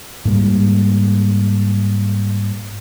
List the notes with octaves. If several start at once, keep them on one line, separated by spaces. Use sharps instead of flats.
G#2 G3 A#3